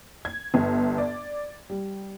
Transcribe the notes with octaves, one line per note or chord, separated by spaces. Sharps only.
G#6
G1
D5
G3